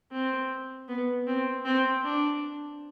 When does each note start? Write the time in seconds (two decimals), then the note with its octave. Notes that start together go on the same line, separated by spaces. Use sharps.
0.12 C4
0.89 B3
1.27 C4
1.65 C4
2.04 D4